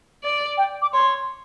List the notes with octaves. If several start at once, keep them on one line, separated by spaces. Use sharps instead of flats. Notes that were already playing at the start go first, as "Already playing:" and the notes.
D5
G5
D6
C#5 C6